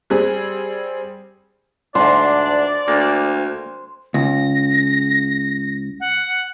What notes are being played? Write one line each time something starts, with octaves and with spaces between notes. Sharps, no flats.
G3 C4 G#4
D2 G#2 D4 C5 D5
D2 A#3
C#2 A#6
F#5